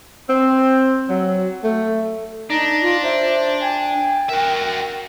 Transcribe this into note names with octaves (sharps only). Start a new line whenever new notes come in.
C4
F#3
A3
D4 D#4 A#5
F4
C5 E5
G5 G#5
F#4 A#4 E5